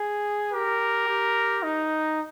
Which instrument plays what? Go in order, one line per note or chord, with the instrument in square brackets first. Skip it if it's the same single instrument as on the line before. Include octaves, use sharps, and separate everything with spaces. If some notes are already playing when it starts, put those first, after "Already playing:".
Already playing: [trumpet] G#4
[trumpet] G4 [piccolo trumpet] A#4
[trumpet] G4
D#4